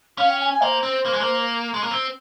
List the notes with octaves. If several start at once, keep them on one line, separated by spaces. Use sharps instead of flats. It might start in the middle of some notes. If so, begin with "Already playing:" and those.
C#4 F5
G5
G#5
G#5
A#3 C5
C4
A#3
G#3
A#3
G#3
A#3
C4